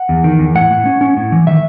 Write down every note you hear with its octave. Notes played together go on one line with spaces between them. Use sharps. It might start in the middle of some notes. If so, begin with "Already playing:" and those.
Already playing: F#5
E2
D#3
E2
A2 F#5
A2
C#4
C#4
A2
E3
D#3 E5